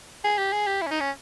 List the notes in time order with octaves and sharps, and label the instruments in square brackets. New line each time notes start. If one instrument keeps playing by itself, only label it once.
[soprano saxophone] G#4
G4
G#4
G4
E4
C#4
D#4
C#4